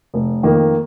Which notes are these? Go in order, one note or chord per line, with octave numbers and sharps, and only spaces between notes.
F1
F2 D#3 A#3